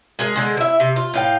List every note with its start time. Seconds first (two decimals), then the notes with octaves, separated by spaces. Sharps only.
0.19 G#3 G#4 A#4
0.36 D3 G#3
0.57 E4 E5
0.80 C3
0.96 F4
1.14 A2 F5 G5